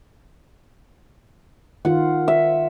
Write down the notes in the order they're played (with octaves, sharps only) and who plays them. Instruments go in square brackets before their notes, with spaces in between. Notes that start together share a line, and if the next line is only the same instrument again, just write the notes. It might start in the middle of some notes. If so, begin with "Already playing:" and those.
[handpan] D#3 F4 [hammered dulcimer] F#5
[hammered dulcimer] E5